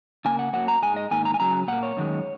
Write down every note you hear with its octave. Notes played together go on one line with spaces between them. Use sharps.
C#3 A#3 G#5
F#5
F#2 F#3 A#3 F#5
A#5
G#2 G#3 G#5
D#5
G#2 D#3 A#3 G#5
A#5
G#5
F#2 C#3 F#3 A#5
A#2 A#3 F#5
C#5
F#2 D#3 G#3